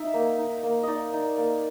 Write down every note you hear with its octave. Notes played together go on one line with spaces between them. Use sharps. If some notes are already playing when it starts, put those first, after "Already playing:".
Already playing: D#4 E5
A#3
D#4
A#3
D#4 D5 D#5
D#4
A#3